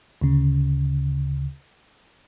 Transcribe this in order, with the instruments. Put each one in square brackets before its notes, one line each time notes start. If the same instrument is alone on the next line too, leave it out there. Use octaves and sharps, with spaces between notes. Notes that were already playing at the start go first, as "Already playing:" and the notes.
[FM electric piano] D2 C#3